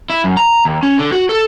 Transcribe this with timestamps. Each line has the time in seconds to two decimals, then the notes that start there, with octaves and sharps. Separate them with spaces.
0.10 E4
0.24 F#2
0.37 A#5
0.65 D#2
0.83 C#4
0.98 D3
1.12 F#4
1.29 A4